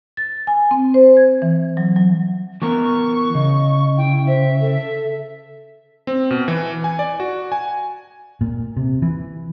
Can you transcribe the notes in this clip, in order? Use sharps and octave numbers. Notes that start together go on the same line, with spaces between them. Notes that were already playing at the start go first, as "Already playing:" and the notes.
A6
G#5
C4
C5
G#6
E3
F#3
F#3
E3 B3 A#4 C#6
C#3 D#5
E4 G5
C5 E5
A4
C4
B2
E3
G#5
D5
F#4
G#5
A#2
C3
E3